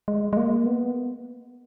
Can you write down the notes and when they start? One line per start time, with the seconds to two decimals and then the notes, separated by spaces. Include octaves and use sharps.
0.08 G#3
0.33 G#3
0.37 A#3
0.66 B3